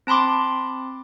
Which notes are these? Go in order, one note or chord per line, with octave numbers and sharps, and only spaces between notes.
C4 A5 B5 C6 D6